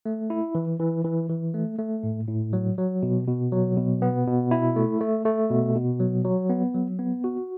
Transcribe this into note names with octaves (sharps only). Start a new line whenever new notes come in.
A3
E4
E3
E3
E3
E3
A3
A3
A2
A2
F#3
F#3
B2
B2
F#3
B2
B3
B2
E4
A3
A3
A3
B2
B2
F#3
F#3
B3
F#3
B3
F#4